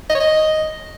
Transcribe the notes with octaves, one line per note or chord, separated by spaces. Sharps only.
D#5
C#5
D#5